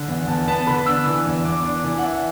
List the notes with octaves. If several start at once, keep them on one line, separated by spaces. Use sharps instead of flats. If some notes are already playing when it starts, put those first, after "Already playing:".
Already playing: D3
E2
E2 A5
B3 A5
D3 B5
D4 E6
E3
E2
E2 D6
D4
E3
F#5
D4 E5